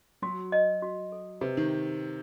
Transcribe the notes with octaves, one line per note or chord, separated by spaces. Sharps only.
F#3 F#4
D#5
F#4
A4
C3 B4
D#3